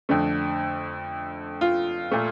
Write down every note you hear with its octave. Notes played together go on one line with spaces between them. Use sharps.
F2 D3 A3
F4
A#2 A3